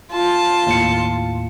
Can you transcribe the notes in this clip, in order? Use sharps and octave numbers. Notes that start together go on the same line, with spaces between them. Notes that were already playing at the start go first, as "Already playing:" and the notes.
F4 A5
D#2 A2 C#7